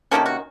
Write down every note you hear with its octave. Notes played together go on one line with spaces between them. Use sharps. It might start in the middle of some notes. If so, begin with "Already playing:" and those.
C3 D#3 A#3 C#4 A4
F#4